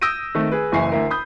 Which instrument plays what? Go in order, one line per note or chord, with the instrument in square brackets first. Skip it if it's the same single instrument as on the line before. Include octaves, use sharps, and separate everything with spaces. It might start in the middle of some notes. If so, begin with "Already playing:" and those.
[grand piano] D#6 E6 G6 A#6 D7 D#7
D#3 A3 C4
G#4 B4
F#1 E3 E5 G#5 C#6 C7
D2 E4 A#4
B5 D#6 G6